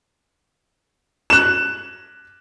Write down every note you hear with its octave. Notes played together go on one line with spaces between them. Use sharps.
F#6 E7